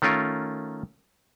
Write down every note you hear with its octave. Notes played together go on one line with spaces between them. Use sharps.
D#3 A3 C#4 F4 A#4